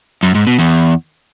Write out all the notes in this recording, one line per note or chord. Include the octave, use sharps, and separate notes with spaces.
F#2
G#2
B2
E2